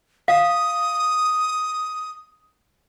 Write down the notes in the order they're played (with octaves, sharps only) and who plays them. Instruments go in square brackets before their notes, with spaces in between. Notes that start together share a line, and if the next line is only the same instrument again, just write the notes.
[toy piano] F5 [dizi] D#6